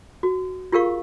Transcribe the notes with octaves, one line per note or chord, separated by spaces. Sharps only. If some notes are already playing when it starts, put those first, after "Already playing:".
F#4
F4 G4 G#4 A#4 F5 C#6